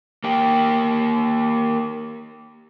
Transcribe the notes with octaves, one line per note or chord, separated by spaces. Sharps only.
A#3 G4